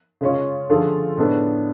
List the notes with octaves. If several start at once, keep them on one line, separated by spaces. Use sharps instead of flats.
C#3 G#3 C#4 F4
D3 F3 A3 F4 G#4
A2 G#3 B3 D4